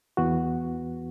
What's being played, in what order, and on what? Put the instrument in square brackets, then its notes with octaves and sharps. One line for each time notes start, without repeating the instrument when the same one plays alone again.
[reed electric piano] E2 E3 B3 F#4